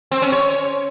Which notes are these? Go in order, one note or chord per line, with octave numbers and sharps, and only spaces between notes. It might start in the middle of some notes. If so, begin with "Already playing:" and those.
C4
C#4
C#5